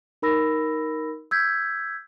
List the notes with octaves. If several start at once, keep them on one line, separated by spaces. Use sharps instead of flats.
D#4 A#4 B5 E6 A#6
E6 G6 G#6 B6